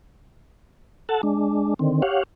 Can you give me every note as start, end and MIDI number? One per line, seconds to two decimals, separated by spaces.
1.09 1.21 69
1.09 1.21 78
1.09 1.21 81
1.23 1.74 56
1.23 1.74 62
1.79 2.02 50
1.79 2.02 51
1.79 2.02 60
2.02 2.23 67
2.02 2.23 73
2.02 2.23 77
2.02 2.23 78